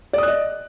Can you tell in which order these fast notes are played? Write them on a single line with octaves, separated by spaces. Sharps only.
D5 D#6 F#6 D#5